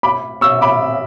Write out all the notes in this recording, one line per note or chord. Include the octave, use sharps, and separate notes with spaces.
B5 D6
C#6 E6
B5 D6